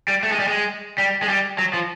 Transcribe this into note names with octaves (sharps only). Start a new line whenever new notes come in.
G3
A3
G#3
G3
G#3
G3
G#3
G3
F#3
F3